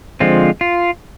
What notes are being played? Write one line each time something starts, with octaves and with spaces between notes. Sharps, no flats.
D3 F3 G#3 C4 F4
F4